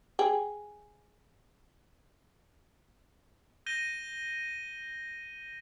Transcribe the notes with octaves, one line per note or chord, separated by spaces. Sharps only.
G#4 G5
G6 A#6 D#7 G7